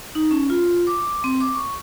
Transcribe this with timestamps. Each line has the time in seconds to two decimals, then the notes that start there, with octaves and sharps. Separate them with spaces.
0.15 D#4
0.31 C#4
0.50 F4
0.87 D6
1.24 C4
1.41 D6
1.55 C#6